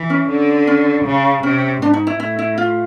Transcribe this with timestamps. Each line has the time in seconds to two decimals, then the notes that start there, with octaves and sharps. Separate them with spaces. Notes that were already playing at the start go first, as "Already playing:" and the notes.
Already playing: E3
0.10 C#4
0.29 D3
0.67 C#4
1.05 C#3
1.43 C3 C#4
1.81 G#2 D4
1.94 D#4
2.07 E4
2.20 A2 E4
2.39 E4
2.58 F4